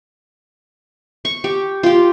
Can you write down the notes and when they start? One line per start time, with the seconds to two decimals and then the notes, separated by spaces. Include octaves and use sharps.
1.25 C#6
1.44 G4
1.83 F4 G4